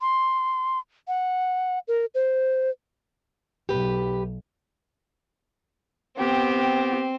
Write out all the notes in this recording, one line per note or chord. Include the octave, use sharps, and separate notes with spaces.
C6
F#5
A#4
C5
B1 G4 B4
B3 C4 G4